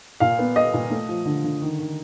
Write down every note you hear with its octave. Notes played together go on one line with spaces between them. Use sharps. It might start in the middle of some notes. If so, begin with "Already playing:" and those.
A#2 F5
B3
B3 D#5
A#2
A3
F3
D3
D3
D#3
D#3